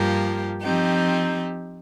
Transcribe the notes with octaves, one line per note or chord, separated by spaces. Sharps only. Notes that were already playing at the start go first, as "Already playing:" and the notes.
Already playing: G2 F3 A#3 G4
F3 C4 D#4 G4